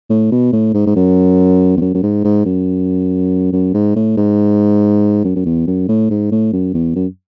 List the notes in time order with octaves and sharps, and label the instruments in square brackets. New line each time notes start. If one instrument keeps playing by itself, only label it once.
[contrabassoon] A2
B2
A2
G#2
G#2
F#2
E2
F#2
F#2
G#2
G#2
F#2
F#2
G#2
A2
G#2
F#2
F#2
E2
F#2
A2
G#2
A2
F#2
E2
F#2